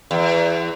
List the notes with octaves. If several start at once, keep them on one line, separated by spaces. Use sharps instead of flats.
E2